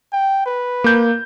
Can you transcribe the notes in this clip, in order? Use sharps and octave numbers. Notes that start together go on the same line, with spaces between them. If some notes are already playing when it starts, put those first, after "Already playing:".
G5
B4
A#3 G6